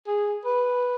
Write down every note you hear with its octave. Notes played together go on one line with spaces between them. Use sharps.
G#4
B4